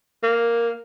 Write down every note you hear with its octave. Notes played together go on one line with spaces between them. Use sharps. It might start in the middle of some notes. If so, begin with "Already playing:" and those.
A#3